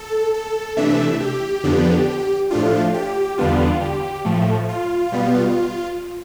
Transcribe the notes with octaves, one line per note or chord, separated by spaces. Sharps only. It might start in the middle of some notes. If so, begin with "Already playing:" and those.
Already playing: A4
A4
C3 E3 A3 D4 E5
G4
F2 D3 F3 B3 D4
A2 F3 A3 D4 F4
G4
E2 D3 G3 B3 D4 F4
G4
A2 F3 A3
F4
B2 G3 B3